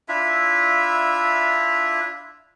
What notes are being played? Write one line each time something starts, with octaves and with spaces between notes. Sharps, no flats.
D4 E4 F4 E5